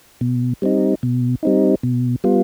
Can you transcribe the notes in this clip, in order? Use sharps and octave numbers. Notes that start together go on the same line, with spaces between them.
B2
G3 C4 D#4
B2
G3 C4 D#4
B2
G3 B3 F4